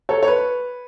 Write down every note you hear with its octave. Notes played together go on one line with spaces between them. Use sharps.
A4 C#5
C#5
B4